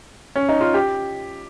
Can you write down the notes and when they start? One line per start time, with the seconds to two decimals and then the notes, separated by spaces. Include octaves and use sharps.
0.36 C#4
0.49 D#4
0.61 F4
0.74 G4